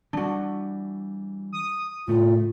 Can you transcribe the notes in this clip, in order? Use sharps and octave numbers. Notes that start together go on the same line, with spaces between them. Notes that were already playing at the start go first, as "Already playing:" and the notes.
E3 G3 D4 F#4
D#6
A2 C#3 A3 F4